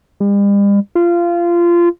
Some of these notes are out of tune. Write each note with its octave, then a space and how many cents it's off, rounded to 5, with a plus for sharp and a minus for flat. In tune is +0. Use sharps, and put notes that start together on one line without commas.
G3 +45
F4 -20